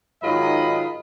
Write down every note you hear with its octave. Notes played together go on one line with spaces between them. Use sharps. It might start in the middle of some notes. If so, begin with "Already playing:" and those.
G#2 D#3 F#3 F4 D#5 B5